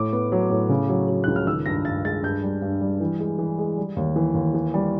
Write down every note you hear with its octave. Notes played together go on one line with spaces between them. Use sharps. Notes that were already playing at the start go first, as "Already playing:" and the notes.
Already playing: A2 D6
B3
F#3
A2
C#3
F#3
F#3
C#2 F#6
F6
D#3 E6
G2 A#6
G2 A6
G#3 A6
G2 G6
G3
G2
G3
E3
G#3
E3
G#3
G3
D#2
E3
D#2
E3
G3